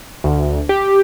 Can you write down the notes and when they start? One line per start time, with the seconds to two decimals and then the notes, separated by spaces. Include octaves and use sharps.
0.24 D2
0.69 G4